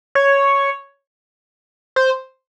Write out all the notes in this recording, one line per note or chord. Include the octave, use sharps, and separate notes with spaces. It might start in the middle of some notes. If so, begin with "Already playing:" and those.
C#5
C5